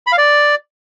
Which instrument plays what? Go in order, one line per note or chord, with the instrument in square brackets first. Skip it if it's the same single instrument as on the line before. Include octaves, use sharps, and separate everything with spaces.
[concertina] B5
F5
D5